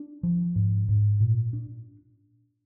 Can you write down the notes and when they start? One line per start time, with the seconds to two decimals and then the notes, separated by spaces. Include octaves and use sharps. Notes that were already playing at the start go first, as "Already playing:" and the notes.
Already playing: D4
0.23 F3
0.56 G#2
0.89 G#2
1.20 A#2
1.53 D4